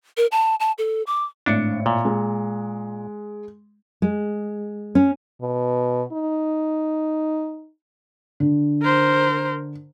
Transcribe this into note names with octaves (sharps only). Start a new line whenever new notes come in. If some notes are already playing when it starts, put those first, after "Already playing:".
A#4
A5
A5
A4
D6
G#1 A2 D4 C#7
A#2
G#3
G#3
C#4
B2
D#4
D3
A#4 C5